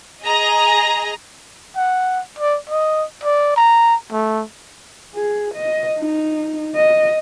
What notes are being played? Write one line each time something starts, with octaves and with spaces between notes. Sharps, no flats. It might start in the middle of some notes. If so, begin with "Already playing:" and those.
G#4 D#5 A#5
F#5
D5
D#5
D5
A#5
A3
G#4
D#5
D#4
D#5